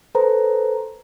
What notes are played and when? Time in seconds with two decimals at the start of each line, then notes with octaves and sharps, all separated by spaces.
0.15 A4 B4 C5 A#5